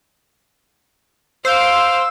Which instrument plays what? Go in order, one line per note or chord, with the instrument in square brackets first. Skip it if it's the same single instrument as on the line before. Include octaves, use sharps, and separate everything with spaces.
[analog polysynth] C5 [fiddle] F5 D6 [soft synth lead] E6